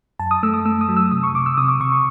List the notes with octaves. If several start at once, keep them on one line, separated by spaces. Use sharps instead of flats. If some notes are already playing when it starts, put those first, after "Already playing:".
F#2 A5
D#6
A3 E6
D#6
A3 E6
D#6
F#3
E6
C3 D#6
C#6
C3 D6
E6
C3 D#6
D6
C3 C#6
C#6